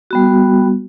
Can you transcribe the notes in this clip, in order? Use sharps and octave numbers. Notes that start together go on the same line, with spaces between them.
G3 B3 F#4